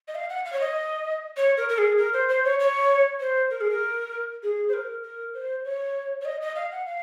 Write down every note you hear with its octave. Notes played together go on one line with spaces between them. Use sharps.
D#5
F5
F#5
F5
C#5
D#5
C#5
A#4
A#4
G#4
A#4
C5
C5
C#5
C#5
C5
A#4
G#4
A#4
G#4
C5
A#4
A#4
C5
C#5
C#5
D#5
D#5
F5
F#5
F5